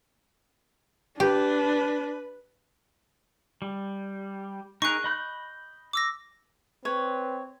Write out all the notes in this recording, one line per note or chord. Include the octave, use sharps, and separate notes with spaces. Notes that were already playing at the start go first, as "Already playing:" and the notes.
D4 G4 B4
G3
D#4 G#4 A#4 C#6 F#6
D#5 B5 G6
D6 E6 A#6
C4 B4 C#5